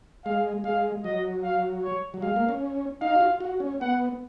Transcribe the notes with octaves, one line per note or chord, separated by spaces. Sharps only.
G#3 F5
G#3 F5
F#3 D#5
F5
C#5
F#3
G#3 F5
A#3
C#4
D#4 F5
F#4
F4
F#4
C#4
B3 F#5